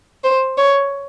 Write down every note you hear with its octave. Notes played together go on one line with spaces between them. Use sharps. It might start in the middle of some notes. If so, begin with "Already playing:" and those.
C5
C#5